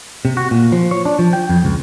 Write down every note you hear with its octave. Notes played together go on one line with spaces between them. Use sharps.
C3
F#4
A#2
F3
C#5
D4
F3
G5
F2
C#2